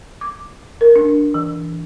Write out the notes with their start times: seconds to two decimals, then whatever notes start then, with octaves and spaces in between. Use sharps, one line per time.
0.21 D6
0.81 A#4
0.96 D4
1.34 E3